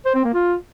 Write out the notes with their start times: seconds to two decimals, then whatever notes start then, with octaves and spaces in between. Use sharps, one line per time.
0.05 C5
0.15 C4
0.24 A#3
0.34 F4